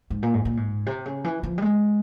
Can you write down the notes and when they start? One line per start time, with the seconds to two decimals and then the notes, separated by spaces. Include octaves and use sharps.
0.10 G#2
0.23 A#2
0.34 G#2
0.45 A#2
0.57 G#2
0.86 C3
1.06 C#3
1.24 E3
1.43 F3
1.58 G3
1.62 G#3